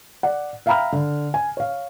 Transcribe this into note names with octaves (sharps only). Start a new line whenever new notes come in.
D5 F#5
E5 F5 G5 A#5 B5 F6
D3
G#5
C#5 F5